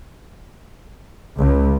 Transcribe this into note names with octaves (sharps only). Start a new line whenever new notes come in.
C#2